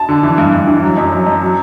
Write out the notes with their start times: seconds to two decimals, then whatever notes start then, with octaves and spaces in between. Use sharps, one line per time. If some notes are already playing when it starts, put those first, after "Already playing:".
Already playing: A5
0.09 D3
0.23 E3
0.38 G2
0.53 G2
0.67 E3
0.82 F#3
0.97 F#2
1.12 F#3
1.27 F#2
1.42 F#3